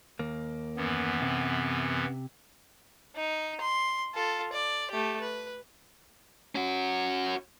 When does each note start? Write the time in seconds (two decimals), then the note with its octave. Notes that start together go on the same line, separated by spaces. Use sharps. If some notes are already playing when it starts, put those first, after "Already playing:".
0.19 D#2 A#3
0.77 F#2 E3 B3
1.22 C3
3.16 D#4
3.61 C6
4.14 F4 A4
4.53 D5
4.91 A3 G4
5.21 B4
6.55 C#4 F#4